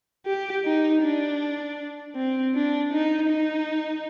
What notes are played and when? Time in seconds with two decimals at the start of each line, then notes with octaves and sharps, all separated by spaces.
0.26 G4
0.65 D#4
1.02 D4
2.16 C4
2.55 D4
2.93 D#4
3.31 D#4